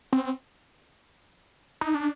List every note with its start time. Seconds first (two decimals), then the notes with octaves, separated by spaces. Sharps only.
0.13 C4
1.81 D#4
1.94 D4